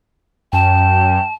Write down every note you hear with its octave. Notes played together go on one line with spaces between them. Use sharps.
F#2 G5 A5